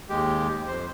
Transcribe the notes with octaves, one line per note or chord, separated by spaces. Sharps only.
D#2 G#3 G4
F2 C5